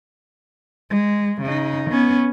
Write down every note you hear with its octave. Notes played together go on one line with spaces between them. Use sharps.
G#3
C#3 D#4
B3 C#4